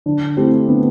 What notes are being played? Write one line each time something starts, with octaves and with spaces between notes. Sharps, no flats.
D3 D4
A3 C4 E4 G4
D3 B3